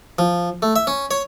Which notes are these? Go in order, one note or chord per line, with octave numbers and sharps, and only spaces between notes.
F3
A3
E5
C#4
C#5